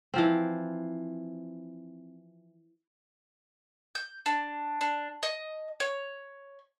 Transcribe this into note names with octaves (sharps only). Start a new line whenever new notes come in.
E3 F3 C4
G6
D4
D4
D#5
C#5